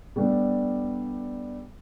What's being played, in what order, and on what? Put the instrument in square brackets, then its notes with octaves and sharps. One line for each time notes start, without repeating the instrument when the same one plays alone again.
[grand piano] G3 A3 B3 D4